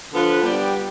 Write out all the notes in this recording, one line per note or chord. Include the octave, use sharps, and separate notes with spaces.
D3 F3 B3 F4 B4
G3 B3 D4 G4